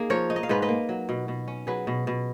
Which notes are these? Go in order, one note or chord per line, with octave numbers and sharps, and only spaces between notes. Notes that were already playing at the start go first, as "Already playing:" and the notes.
Already playing: A#3 D#4 G#4
F3 A#4 C#5
D#4
D#5
F5
G#2 B4 D#5
B4 D#5
A#3
F#3
B2
B2
C#4
F#3 G#4 B4
B2
B2